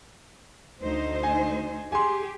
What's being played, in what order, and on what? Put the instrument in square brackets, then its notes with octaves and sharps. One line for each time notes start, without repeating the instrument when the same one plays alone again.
[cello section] D2 D#4 C5
[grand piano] G#5
[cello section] G4 G#4 [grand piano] G#5 C6